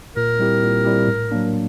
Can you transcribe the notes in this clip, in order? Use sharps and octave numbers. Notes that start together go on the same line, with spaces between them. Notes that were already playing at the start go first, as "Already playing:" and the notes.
A#2 A#4
G3 C4 E4 G4
A#2
G3 C4 E4 G4
A2
F#3 A#3 D4